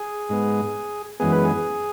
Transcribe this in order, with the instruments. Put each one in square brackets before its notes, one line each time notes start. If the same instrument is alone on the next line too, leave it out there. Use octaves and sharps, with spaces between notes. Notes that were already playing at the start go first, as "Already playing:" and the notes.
Already playing: [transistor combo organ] G#4
G#2 G#3 B3
F#2 E3 G#3 B3 G#4
B4
G#4